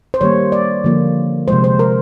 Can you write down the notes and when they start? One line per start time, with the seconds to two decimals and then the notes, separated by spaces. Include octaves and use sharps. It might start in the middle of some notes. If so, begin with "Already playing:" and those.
0.14 C5
0.21 D#3 G3 A#3 C#5
0.52 D5
0.84 D3 F3 A#3
1.48 C3 F3 G#3 C5
1.64 C5
1.79 A#4